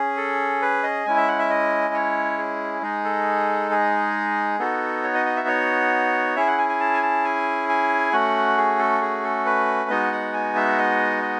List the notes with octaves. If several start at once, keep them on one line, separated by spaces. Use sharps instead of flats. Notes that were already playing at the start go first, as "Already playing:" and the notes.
Already playing: C#4 G#4
A4
B4
D#5
G#3 C#4 E4 G#5
E5
F#5
E5
D#5
C#5
G#4
G#3 D#4 G#4
A4
G#4
B3 D#4 F#4 A4
C#5
D#5
D#5
E5
C#5
C#4 E4 G#4 E5
F#5
G#5
G#5
A5
G#5
A5
G#5
G#5
A3 C#4 F#4 F#5
G#4
A4
G#4
A4
B4
G#3 B3 D#4 F#4 D#5
F#5
G#5
E5
D#5
D#5